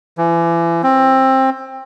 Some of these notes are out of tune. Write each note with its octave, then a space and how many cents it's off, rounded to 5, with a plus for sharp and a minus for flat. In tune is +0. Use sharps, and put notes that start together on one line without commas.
E3 +35
C4 +20